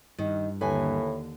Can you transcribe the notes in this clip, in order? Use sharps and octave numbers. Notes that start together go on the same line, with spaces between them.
G2 D#3
D#2 A2 D3 B4 G#5